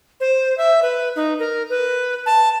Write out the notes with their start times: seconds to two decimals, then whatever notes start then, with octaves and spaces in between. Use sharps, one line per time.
0.20 C5
0.58 E5
0.83 B4
1.16 D#4
1.39 A#4
1.70 B4
2.26 A5